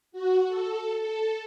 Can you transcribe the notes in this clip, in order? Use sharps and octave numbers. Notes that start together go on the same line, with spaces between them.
F#4
A4
A4